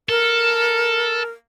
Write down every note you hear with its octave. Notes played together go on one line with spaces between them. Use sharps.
A4 A#4